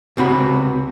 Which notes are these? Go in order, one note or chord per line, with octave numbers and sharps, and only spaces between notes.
C#2 C3 F#4 B5